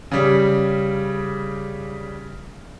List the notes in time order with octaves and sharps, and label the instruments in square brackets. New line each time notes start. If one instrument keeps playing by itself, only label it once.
[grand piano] C#3 G3